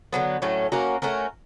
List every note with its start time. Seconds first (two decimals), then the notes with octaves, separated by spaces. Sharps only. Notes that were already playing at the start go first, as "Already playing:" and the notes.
0.13 D3 F#3 B3
0.42 A2 F#3 A3 C#4
0.72 A#3 C#4 F#4 A#4
1.02 A3 C#4 F#4 A#4